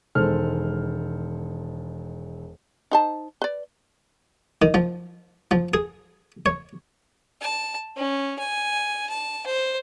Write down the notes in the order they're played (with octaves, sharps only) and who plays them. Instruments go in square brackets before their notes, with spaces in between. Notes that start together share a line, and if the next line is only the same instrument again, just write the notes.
[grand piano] E1 D#3 G#3 A4 C5 F6
[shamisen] D#4 C5 A5
B4 D5
[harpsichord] D#3
F3
F3
G#4
C#5
[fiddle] A5
C#4
G#5
A5
C5